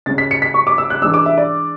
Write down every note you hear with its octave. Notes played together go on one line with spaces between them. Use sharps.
C#3 G#3 C#4 A6
B6
C#7
B6
C#6
D6
E6
F#6
E3 G#3 D4 E6
D6
E5
D5